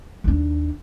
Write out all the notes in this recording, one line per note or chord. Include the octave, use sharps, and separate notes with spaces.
D#2 D4